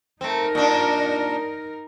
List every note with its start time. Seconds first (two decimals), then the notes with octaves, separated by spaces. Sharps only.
0.21 A3 C4 D#4 A#4
0.55 A#2 D4